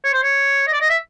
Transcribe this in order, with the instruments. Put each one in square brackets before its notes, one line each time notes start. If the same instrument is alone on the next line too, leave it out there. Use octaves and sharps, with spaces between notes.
[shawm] C#5
C5
C#5
D#5
D5
D#5
E5